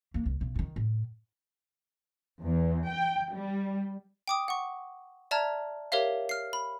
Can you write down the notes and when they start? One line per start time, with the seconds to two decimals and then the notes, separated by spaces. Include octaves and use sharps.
0.14 A#3 D4
0.26 C2
0.41 B1
0.55 G2 D#3
0.76 A2
2.43 E2
2.89 G5
3.32 G3
4.28 G5 D6 D#6
4.48 F#5 C#6
5.31 D5 E5 A5 A#5 F6 G#6
5.92 G4 A#4 C#5 E5 F5
6.29 F6 C7
6.53 B5